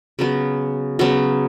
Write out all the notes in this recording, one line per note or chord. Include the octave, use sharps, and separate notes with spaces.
C#3 F#3 B3 F#4
C#3 F#3 B3 F#4